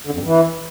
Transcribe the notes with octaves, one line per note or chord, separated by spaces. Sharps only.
D3
F2
G2
E3